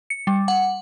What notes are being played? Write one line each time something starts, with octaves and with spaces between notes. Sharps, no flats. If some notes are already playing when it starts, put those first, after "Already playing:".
C#7
G3
F#5